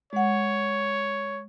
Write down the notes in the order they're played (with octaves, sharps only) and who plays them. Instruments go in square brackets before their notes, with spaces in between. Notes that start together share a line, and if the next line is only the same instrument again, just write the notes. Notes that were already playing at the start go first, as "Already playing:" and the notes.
[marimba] G#3 F#5 [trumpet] C#5